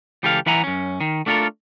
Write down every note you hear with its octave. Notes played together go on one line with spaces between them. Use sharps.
C#2 E3 G4 A4 B4 F5
E3 E4 E5 F#5 G#5 A#5
F#2 C#4
D#3
A3 D4 F4 F#4 A4 A#4